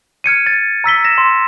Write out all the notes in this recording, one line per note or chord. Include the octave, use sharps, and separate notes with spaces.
F6 G#6 C#7 D#7
A6
A#5 E6 B6 G7
A#6 E7
C6